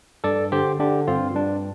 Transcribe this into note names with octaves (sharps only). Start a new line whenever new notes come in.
G2 A4 D5
D3 G4 C5
D3 D4 G4
G2 C4 F4
G2 D4